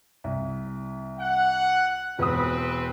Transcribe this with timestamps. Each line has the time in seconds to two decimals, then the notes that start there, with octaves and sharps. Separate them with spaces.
0.24 C2
1.19 F#5
2.19 E1 C4 B4 D#6